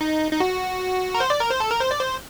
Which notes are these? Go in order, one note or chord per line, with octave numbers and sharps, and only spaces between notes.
D#4
D#4
F#4
A#4
C5
D5
A#4
C5
A4
A#4
C5
D5
C5